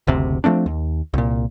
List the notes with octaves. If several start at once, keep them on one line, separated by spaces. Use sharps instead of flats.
F#1 D2 C3
F3 A3 C4 D4
D#2
C2 A#2